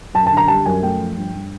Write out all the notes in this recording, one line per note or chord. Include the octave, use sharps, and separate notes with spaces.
F#2 A5
D3 A5
A#5
G3 A5
F#2 G#5
A3 G5
F3
G2
G2